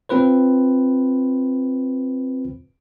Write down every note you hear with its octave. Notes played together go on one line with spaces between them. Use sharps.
C4 F4 B4 C5